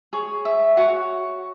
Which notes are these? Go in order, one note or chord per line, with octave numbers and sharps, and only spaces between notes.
G#4 C#5
E5
F#4 C#5 F#5